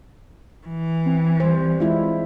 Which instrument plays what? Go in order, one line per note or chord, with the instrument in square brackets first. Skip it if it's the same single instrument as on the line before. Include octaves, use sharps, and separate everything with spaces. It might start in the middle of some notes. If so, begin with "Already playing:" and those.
[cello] E3
[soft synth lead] C4
[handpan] G3 C5
[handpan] G#3 E4 [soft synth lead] F4